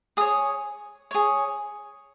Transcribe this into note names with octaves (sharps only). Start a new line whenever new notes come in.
G#4 C#5 D#6
G#4 C#5